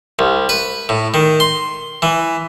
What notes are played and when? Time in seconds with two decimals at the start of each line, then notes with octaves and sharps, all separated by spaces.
0.19 C2
0.49 B4
0.89 A2
1.14 D#3
1.40 C6
2.02 E3